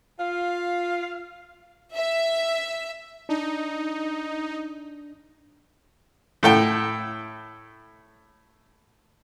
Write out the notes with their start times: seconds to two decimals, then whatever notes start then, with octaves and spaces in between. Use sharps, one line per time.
0.19 F4 F5
1.95 E5
3.29 D4 D#4
6.43 A2 A4 G5